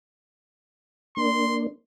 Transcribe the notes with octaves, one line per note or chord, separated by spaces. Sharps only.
A#3 D4 C6